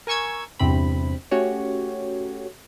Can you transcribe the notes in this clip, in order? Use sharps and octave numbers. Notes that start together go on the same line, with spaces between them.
A#4 G#5 C#6 E6 G#6
E2 G2 C3 C4 B5
A3 C#4 F#4 G4 C#5